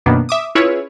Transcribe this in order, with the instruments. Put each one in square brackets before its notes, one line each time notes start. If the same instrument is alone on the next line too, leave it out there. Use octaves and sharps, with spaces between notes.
[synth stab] F#2 B2 D#3 A#3 B3 D4
E5 D6 D#6
C#4 E4 F4 G#4 B4 C#5